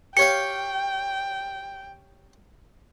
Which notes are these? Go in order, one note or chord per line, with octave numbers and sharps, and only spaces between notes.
G4 C#5 F5 G5 C#7